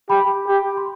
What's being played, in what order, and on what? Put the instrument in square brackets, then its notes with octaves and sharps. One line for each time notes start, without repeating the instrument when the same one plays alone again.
[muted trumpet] G4 [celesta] G5 B5
[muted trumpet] G4
[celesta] C6